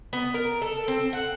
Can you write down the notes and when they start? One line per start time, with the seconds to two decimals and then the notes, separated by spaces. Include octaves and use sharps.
0.13 B3
0.34 A#4
0.62 A4
0.88 C4
1.13 F#5